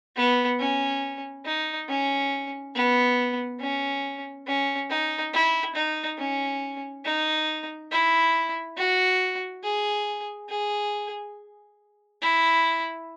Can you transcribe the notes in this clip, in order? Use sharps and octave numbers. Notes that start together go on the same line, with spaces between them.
B3
C#4
D#4
C#4
B3
C#4
C#4
D#4
E4
D#4
C#4
D#4
E4
F#4
G#4
G#4
E4